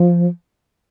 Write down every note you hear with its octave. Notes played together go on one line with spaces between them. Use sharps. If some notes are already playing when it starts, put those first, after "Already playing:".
Already playing: F3